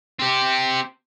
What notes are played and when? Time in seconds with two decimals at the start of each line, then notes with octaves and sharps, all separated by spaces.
0.19 C4 G4